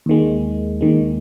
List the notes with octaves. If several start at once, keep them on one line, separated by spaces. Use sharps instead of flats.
D#2 D#3 G#3
D#2 D#3 G#3